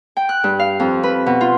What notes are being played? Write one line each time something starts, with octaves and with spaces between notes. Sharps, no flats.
G5
F#6
G2
F5
F2
B4
B2
F4